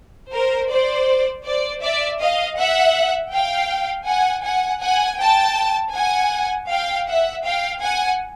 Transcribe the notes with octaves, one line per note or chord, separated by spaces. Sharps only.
A#4 C5
C5 D5
C5 D5
D5 E5
D#5 F5
E5 F#5
F5 G5
F#5 G#5
F#5 G#5
F#5 G#5
G5 A5
F#5 G#5
F5 G5
E5 F#5
F5 G5
F#5 G#5